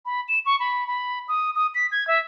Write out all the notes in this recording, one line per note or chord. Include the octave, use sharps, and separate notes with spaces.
B5
E7
C#6
B5
B5
D#6
D#6
B6
G#6
E5